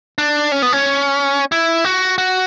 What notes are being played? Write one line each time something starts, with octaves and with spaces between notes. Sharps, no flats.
D4
C#4
B3
C#4
E4
F#4
F#4